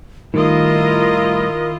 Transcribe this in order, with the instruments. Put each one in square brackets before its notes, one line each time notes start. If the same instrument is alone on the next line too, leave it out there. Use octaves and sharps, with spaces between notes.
[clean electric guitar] A2 G3 A3 [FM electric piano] D#3 [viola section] E4 F4 D#5 [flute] A#4